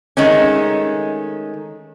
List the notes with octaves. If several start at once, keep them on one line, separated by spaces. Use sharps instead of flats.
D#3 G#3 A3 C#4